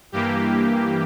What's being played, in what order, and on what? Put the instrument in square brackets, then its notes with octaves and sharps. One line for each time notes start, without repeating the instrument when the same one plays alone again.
[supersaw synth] G2 E3 A#3 G4